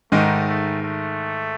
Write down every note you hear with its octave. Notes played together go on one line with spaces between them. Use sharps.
G#2 D#3 G#3 A3 D#4
A3
A3